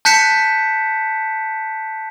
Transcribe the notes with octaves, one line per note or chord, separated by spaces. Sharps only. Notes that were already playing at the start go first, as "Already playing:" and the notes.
A5 F#6 G6 B6 C#7 E7